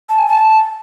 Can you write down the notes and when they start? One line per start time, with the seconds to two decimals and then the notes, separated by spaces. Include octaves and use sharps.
0.09 A5
0.18 G#5
0.28 A5